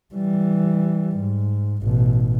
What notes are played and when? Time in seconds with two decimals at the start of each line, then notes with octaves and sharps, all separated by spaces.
0.14 E3 G3
1.16 G#2
1.84 A1 B2